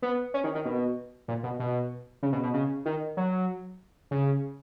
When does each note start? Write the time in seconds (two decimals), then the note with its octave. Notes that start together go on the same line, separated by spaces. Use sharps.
0.02 B3
0.34 C#4
0.44 D#3
0.55 D#3
0.65 B2
1.28 A#2
1.43 B2
1.60 B2
2.23 C#3
2.33 B2
2.43 B2
2.54 C#3
2.85 D#3
3.17 F#3
4.11 C#3